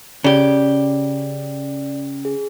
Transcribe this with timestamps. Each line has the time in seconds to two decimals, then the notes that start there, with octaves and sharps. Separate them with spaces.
0.24 C#3 G4 D5
2.25 G#4